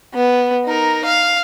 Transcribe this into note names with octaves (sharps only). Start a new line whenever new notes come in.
B3
D#4 A#4
F5